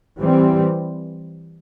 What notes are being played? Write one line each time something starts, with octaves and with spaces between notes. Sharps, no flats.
E3 G3 C4